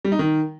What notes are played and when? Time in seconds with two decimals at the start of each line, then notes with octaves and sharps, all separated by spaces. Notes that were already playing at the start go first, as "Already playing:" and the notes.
0.05 G3
0.12 D#4
0.19 D#3